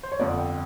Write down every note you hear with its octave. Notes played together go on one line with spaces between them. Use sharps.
C5
C#5
G1 F2 D3 D5
G5